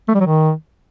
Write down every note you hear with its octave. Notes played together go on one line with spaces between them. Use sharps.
A3
G3
F#3
D#3